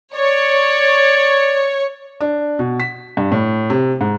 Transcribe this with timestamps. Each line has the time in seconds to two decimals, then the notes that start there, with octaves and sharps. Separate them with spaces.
0.14 C#5 D5
2.21 D4
2.59 B2
2.80 B6
3.17 G2
3.32 A2
3.70 C3
4.01 G#2